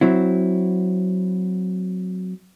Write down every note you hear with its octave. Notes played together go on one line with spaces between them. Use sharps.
F#3 C4 E4